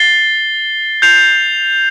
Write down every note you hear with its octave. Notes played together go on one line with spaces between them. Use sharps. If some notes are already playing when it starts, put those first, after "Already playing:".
Already playing: A6 C7 G7
G6 C7 F7